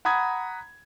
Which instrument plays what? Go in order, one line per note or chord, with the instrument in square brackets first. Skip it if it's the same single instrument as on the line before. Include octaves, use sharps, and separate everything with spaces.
[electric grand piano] F#5 A#5 B5 D#6 G#6